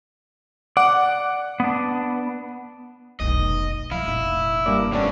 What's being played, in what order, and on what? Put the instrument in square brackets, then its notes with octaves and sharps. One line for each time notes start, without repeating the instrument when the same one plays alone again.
[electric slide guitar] D5 [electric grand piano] F#5
[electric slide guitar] B3 D4
[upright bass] F1 B1 [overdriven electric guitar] D#5
[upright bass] F3 G#3 [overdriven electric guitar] E4 [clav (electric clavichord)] F5
[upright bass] F1 A#1
[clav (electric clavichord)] G2 A#3 D5
[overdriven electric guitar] A2 C#4 [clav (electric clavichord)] B3 D4